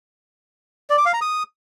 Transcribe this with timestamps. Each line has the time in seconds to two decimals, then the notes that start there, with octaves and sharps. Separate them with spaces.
0.90 D5
0.98 D6
1.06 F5
1.14 A#5
1.21 D#6